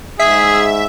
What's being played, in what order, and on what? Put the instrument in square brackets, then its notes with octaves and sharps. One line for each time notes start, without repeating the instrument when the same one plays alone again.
[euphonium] G#2 [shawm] G#4 [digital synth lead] E5